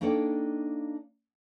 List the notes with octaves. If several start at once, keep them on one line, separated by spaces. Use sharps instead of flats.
A#3 D4 D#4 A4 C#5 G5